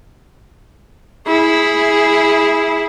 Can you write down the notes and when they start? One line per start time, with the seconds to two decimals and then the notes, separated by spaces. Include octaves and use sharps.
1.28 E4 G#4